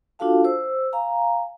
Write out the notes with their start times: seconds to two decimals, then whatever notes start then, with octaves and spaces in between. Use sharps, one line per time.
0.19 D4 F4 F#4 A4 F5 A5
0.44 C5 E6
0.93 F5 G#5 A#5